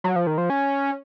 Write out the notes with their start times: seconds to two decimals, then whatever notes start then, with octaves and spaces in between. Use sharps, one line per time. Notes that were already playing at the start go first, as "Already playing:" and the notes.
0.04 F#3
0.16 F3
0.27 D#3
0.38 F3
0.50 C#4